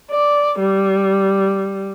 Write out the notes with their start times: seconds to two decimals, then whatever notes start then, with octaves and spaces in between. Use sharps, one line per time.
0.11 D5
0.60 G3